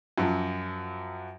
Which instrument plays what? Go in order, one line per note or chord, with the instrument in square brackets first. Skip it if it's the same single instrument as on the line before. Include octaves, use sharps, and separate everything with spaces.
[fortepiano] F#2 F3 F#3